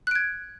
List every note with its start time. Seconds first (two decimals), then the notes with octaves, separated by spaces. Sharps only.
0.07 F#6
0.11 D7
0.15 G#6